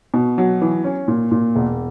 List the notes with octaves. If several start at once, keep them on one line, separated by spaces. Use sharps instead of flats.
B2
F#3
E3
C#4
A#2
A#2
E1